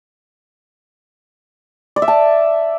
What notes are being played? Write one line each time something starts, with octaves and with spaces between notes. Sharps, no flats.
D5
E5
A5